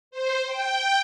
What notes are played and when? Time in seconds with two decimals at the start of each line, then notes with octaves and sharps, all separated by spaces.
0.11 C5
0.46 G5